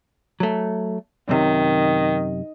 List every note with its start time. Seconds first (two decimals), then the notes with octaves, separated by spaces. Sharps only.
0.40 F#3 A3
1.29 F#2 C3 D#3